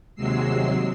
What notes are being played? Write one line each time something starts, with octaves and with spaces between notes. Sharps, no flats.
D#2 C3 F#3 G#3 E6 C7